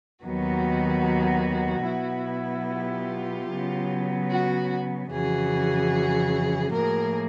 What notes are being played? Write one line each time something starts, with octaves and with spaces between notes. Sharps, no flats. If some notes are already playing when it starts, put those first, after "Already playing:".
D#2 D#3 F#3 B3 F#4
B2 F#3 B3 E4
F4 G4
C#3 F#3 B3
F#4
F2 C#3 E3 F#4 G#4
A2 F3 A#3 G#4 A#4